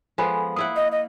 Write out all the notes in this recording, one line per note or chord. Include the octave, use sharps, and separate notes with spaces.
F3 G#3 B3 A4 G#5 B5
A#3 E4 F#5 D#6
D#5
D#5